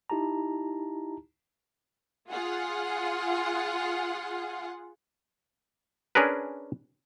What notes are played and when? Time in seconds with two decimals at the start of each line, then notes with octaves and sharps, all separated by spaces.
0.10 D#4 E4 G4 A5 A#5
2.31 F4 G#4 F#5
6.15 C#4 D4 G#4 A#4 B4